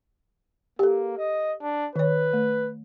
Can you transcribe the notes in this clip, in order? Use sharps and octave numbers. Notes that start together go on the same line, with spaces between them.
A#3 G4 A4
D#5
D4
D#3 B4 C#5
A3